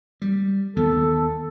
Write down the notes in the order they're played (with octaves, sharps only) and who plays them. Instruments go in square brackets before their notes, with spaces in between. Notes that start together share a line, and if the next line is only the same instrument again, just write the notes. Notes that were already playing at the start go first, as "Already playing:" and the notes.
[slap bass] G3
[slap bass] D#2 D#3 B3 [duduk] A4